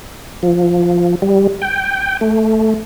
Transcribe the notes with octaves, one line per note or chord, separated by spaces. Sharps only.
F3
G3
G5
A3